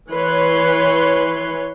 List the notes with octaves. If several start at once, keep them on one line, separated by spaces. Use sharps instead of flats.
E3 B4 C#5 C6